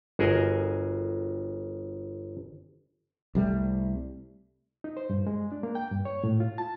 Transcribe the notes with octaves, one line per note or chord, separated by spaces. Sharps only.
G1 F#4 G#4 A#4 D#5 G#5
C2 G3 A3
D#4
C5
G2
G#3
D4
A#3
G5
G2
C#5
A2
F4
A5